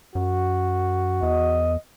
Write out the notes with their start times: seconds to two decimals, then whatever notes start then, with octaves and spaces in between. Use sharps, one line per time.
0.15 F#2 F#4
1.22 E2 D#5